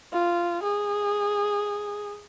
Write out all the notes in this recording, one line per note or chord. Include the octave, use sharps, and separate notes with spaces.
F4
G#4